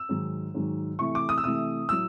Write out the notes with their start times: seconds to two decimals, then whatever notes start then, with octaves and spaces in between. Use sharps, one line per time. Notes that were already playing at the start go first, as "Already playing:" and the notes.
Already playing: E6
0.09 G#2 D#3 F#3
0.54 G#2 D#3 F#3
0.99 C3 E3 A3 C#6
1.15 D6
1.29 D#6
1.38 E6
1.44 C3 E3 A3 D#6
1.89 A2 F#3 E6